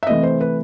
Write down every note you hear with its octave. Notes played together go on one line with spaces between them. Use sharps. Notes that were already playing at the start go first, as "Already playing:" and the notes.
E5
C3 E3 A3 D#5
C5
B4